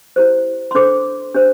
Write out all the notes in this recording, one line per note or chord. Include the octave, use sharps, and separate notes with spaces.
E4 G4 C5
C6
D4 A4 C5 D6
D4 G4 C5